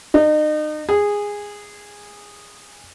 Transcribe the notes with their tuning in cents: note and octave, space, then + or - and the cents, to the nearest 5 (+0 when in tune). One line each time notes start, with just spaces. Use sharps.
D#4 -35
G#4 -15